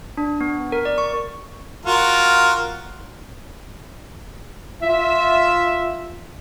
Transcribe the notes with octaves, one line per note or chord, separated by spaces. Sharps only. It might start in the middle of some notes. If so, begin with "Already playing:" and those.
D4
B3
A#4
D5
C#6
F4 F#4 A#4
F4 E5